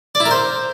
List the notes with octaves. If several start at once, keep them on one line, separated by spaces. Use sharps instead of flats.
D5
E4
A#4
C5